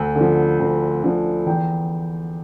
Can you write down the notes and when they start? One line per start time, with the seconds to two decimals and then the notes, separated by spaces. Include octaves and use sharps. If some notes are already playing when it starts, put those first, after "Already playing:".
Already playing: D2
0.16 D3
0.21 F3
0.59 D2
1.03 D3 F3
1.46 E2 G5